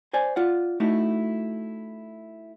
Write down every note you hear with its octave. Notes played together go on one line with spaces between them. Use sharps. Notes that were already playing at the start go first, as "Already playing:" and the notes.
C5 D5 G#5
F4 D5 F#5
A3 D#4 E4 F#4